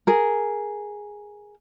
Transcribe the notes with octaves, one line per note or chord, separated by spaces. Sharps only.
G#4 A#4